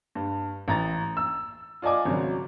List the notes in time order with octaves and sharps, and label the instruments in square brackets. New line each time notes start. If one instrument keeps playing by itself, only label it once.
[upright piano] G2
A1 A#5 A6
E6
F4 D5 D#5 G#5 D6
G#1 C#3 F#3